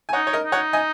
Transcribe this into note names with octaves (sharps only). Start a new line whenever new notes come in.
G#5
D#4 C#5 F#5
C#5
A#4 D#5
D#4
C#5 F#5
D#5 G#5